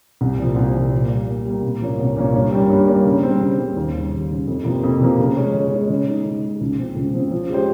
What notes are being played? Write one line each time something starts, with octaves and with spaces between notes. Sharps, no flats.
C2
A#2 F3
C2
A#2 F3
A#2
G3 A#3
A#2
G3 A#3
C2
A#2 F3 A#3 C#4
C2
A#2 F3 A#3 C#4
G2
G3 A#3 C#4
G2
G3 A#3 C#4
C#3
G3 C4
C#3
G3 C4
D#2
C#3 G3
D#2
C#3 G3
F2
C3 F3 A#3
F2
C3 F3 A#3
C#3
G#3 C#4
C#3
G#3 C#4
C#3
G#3 D#4
C#3
G#3 D#4
C#2
C#3 F3 C4
C#2
C#3 F3 C4
F3
G#3 C#4 G4 C5